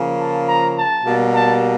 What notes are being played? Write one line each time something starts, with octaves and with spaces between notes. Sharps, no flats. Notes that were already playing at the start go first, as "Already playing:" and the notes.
Already playing: C#3 F3 A#3
A5
A#5
A5
B2 G3 A#3
A5